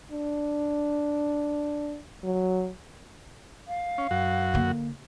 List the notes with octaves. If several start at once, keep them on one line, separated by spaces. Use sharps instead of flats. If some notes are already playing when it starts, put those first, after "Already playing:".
D4
F#3
F5
C#4
F#2 F#4
D3 A#3